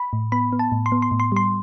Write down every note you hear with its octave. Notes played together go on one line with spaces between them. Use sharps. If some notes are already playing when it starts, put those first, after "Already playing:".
Already playing: B5
A2
B3 B5
B3
A5
A2
C6
B3
C6
A2
C6
G3 C6